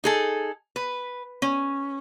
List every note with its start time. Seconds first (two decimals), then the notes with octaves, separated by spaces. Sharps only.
0.04 D#4 G#4 A4
0.76 B4
1.42 C#4